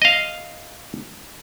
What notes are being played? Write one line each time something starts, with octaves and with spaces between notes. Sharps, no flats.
D#5 F5